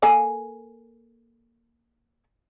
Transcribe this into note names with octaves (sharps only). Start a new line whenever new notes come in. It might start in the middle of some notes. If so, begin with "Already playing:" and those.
A#3 A4 G#5